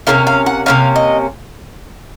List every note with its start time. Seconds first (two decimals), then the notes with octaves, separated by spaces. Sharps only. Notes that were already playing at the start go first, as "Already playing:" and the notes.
0.07 C3 F#3 A#3 C#4 F5
0.27 F5
0.46 F#5
0.66 C3 F#3 A#3 C#4 F5
0.96 D#5